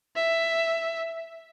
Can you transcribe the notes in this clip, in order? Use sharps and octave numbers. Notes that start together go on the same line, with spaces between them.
E5